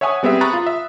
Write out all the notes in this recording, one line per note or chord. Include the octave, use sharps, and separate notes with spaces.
C#5 E5 F#5 G#5 C#6 D#6
G3 B3 C4 G#4 E5
A#5 B5 C#6 D#6 F#6 A6
F4
E5